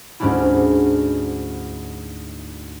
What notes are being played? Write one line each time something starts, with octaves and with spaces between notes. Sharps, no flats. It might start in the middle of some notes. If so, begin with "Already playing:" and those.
D2 G#2 G3 C#4 D4 E4